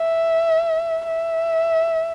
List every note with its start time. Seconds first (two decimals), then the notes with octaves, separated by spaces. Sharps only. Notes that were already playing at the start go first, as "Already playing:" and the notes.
Already playing: E5
1.07 E5